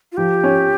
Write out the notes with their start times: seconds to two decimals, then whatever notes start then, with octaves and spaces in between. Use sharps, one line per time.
0.12 F4
0.17 F3 G4
0.43 C#4